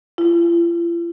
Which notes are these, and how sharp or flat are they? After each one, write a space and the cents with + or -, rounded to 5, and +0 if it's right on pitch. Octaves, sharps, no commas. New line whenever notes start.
F4 -45